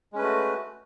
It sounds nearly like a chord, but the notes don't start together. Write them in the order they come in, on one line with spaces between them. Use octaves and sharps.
G#3 C#4 B4 A3 F#4